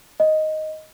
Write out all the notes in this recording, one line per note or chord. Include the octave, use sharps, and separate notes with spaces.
D#5